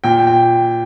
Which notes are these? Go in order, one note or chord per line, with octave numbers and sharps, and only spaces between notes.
A#2 G5
G5